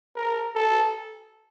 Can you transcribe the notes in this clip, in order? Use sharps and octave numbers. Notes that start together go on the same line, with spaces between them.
A#4
A4